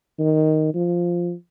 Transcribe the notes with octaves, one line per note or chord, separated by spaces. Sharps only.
D#3
F3